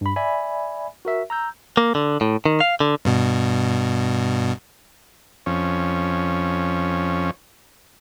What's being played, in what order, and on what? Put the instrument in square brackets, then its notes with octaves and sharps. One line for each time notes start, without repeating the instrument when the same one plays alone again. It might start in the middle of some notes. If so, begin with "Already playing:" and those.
[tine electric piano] G2 B5
D5 E5 G#5 B5
F#4 A#4 E5
A#5 E6 G6
[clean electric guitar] A#3
D3
A2
D#3
F5
D3
[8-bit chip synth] G2 B2
[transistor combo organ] F2 C#4